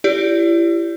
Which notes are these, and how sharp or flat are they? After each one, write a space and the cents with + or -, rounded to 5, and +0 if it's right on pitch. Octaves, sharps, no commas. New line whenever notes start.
E4 +35 G4 +0 D5 -25